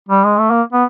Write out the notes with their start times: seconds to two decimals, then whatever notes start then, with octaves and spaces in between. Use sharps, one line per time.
0.09 G3
0.24 G#3
0.39 A3
0.50 A#3
0.73 B3